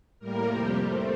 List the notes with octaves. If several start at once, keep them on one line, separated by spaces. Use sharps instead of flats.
A2 G3 A#3 A#4
F2 C3 G3 C4 G4
A2 A3 C4